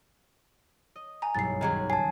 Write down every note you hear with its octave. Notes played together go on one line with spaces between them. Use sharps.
D#5
G#5 A#5
F#1 B1 G2 A6 C7
D#2 D#3 F#3 C#4 G#4
C#2 G#5 A5 C7